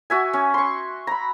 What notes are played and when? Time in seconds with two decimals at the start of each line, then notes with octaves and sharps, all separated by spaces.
0.10 F#4 E5 G#5
0.33 C#4
0.54 C6 C#6
1.07 A#5 B5